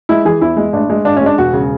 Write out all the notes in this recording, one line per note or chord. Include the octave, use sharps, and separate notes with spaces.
G#3 E4
E3 G#4
E2 E4
G#3
A1 D4
G#3
G#1 D4
C#4
G#3
D4
E1 F#4
C#3